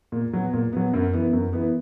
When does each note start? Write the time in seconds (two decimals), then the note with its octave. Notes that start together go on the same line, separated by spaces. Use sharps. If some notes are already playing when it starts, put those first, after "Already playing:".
0.12 A#2
0.33 F#3 B3
0.53 A#2
0.73 F#3 B3
0.93 F#2
1.13 E3 B3
1.33 F#2
1.53 E3 B3